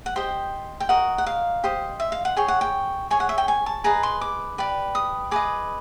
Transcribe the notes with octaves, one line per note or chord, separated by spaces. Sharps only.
F#5
G4 C5 D#5 G5
G5
F#4 A#4 D#5 F#5
F#5
F5
G4 C5 D#5
E5
F5
F#5
G#4 C#5 G5
F#5
G5
G#4 C#5 G#5
F#5
E5
G5
G#5
A5
G#4 B4 D#5 A#5
C6
D6
G4 B4 D5
D#6
G#4 B4 D#5 D6